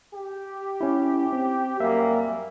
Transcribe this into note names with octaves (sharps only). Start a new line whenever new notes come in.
G4
C#4 E4
C4
F#2 G3 A#3 E5